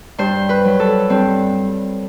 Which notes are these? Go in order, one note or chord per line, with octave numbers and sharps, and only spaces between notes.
G2 C5
B4
F#3
A4
G2 C4